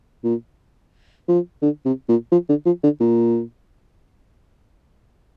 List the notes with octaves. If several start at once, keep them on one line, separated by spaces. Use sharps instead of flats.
A#2
F3
D3
C3
A#2
F3
D3
F3
D3
A#2